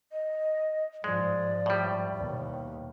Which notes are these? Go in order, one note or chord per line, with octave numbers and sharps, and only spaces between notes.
D#5
G#2 F3 G#3 D5
A2 G3
D#2 B2